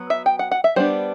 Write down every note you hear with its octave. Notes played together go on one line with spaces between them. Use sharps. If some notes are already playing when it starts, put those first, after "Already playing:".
Already playing: F#3 B3
E5
G5
F#5
F#5
E5
G3 B3 D4 C5